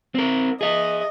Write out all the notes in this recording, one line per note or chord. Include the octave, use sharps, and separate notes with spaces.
C4 A#4
G#4 D#5 E5